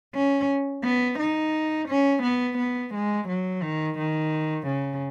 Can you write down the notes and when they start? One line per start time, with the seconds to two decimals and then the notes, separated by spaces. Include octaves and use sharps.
0.14 C#4
0.84 B3
1.19 D#4
1.88 C#4
2.23 B3
2.58 B3
2.94 G#3
3.28 F#3
3.62 D#3
3.98 D#3
4.67 C#3